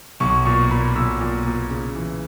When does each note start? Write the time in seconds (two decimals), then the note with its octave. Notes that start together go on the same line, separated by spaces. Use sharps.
0.20 B1 C#6
0.45 A#2 C#6
0.70 A#2 B5
0.96 B1 E6
1.21 A#2
1.45 A#2
1.70 C#3
1.95 E3